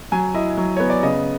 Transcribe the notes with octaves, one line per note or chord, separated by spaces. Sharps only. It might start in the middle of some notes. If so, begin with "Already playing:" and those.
F#3 G#5
E4 D#5
F#3
B3 C#5
D5
C#3 D#5